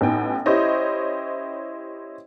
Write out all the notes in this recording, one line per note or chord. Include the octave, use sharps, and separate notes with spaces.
A1 B3 D#4 G5 G#5
C#4 E4 G4 C5 C#5 D#5